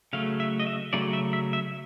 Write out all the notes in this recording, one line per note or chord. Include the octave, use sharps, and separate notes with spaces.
C#3 F#3 A3 F5
E5
D#5
E5
C#3 F#3 A3 D5
E5
E5
E5